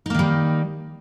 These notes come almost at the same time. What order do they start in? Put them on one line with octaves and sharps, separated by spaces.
D#4 A#3 D#3 G3